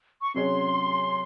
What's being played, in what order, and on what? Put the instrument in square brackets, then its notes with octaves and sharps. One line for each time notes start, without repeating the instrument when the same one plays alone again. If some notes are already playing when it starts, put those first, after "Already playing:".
[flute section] C#6
[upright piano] C3 F#3 C#4 G#4 C#5 [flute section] C6